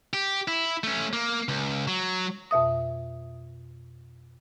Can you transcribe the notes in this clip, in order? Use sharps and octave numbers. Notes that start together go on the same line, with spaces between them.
G4
E4
A3 C#4
A#3
C#2
F#3
F2 B2 E5 D#6